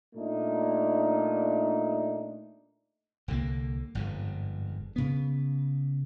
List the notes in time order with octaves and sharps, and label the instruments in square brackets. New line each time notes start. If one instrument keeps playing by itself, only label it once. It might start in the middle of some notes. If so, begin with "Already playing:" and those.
[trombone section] A#2 A3 D4 D#4
[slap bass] C2 D3 G#3 A#3
G1 F2 G#2
C#3 B3